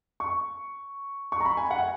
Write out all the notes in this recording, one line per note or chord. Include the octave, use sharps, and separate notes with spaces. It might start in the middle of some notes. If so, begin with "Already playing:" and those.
C#6
C#6
A#5
B5
G#5
F#5
G#5